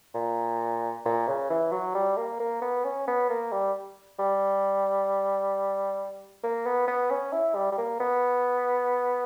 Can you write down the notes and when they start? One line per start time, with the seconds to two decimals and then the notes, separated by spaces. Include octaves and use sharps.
0.15 A#2
1.05 A#2
1.27 C#3
1.50 E3
1.72 F#3
1.95 G3
2.17 A#3
2.40 A#3
2.62 B3
2.84 C#4
3.07 B3
3.29 A#3
3.52 G3
4.19 G3
6.43 A#3
6.66 B3
6.87 B3
7.10 C#4
7.32 E4
7.55 G3
7.72 G3
7.78 A#3
8.00 B3